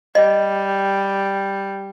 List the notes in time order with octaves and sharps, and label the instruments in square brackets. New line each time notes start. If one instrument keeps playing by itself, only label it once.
[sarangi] G3 [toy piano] D#5